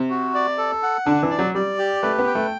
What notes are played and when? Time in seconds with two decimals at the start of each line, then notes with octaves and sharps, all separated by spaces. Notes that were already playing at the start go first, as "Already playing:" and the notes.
Already playing: C3
0.10 F#4
0.35 D5
0.58 A4
0.83 F#5
1.06 D3 D4
1.23 E3
1.31 D5
1.39 F#3
1.55 G3 D5
1.78 G4
2.03 A3 B4
2.19 B3
2.27 G5
2.35 A3